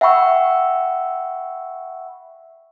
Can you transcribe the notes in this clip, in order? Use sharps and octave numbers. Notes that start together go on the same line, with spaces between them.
E5 F#5 G5 B5 C#6 E6